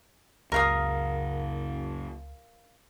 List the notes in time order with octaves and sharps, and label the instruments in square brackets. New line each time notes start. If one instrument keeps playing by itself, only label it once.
[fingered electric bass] F#1 C#3 [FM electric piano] C#2 [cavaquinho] A#4 F5 D#6